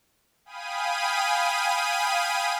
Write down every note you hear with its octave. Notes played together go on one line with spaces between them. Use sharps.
F5 G5 G#5 B5 D#6 D#7